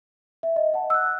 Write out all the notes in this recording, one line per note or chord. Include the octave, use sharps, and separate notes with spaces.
E5
D#5
F#5 A5
E6 F#6